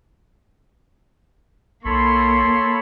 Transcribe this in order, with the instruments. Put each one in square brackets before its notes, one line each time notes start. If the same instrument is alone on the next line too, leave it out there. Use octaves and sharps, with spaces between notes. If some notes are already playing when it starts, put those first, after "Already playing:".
[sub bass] B1 [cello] A#3 [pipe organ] A4 C#5 B5 [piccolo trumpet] C6